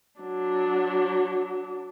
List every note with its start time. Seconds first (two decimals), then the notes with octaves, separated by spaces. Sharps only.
0.20 F#3 D4